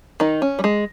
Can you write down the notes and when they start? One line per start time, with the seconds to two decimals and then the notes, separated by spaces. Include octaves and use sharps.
0.20 D#3 D#4
0.42 C#4
0.59 G3
0.64 G#3